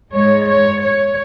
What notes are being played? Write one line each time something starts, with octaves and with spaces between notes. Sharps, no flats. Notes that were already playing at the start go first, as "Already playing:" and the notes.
G#2 G#3 C#5
C#5
C#5